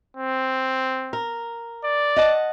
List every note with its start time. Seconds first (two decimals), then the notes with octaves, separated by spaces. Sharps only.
0.17 C4
1.13 A#4
1.84 D5
2.16 D#5 F#5 A5